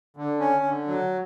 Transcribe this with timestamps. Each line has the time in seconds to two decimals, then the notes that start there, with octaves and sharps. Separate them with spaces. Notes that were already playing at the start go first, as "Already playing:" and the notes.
0.17 D3
0.40 C#4
0.64 D3
0.87 F#3